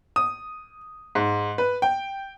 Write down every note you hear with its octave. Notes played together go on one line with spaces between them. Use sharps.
D#6
G#2
B4
G5